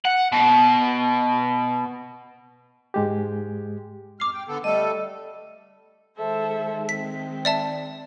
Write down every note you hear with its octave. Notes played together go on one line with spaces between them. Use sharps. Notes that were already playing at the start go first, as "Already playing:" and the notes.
F#5
B2
G#2 G#3 G4
F2 D6 F6 C7
G5
D3 B3 A4
G3 A3 A4 D#5
D#3 G#3 A4 C5 E5
C4 B6
D5 E5 A5